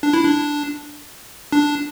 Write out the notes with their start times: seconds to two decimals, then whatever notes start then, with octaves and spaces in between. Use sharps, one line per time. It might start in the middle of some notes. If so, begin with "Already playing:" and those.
0.03 D4
0.13 E4
0.24 D4
1.52 D4